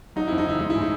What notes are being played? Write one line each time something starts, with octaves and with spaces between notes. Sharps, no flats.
F#3 D#4
F2 E4
D#4
C#3 E4
G#3 D#4
E4
A2
D#4